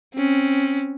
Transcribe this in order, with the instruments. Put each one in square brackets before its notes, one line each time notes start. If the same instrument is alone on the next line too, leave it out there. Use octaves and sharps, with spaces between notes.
[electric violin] C4 C#4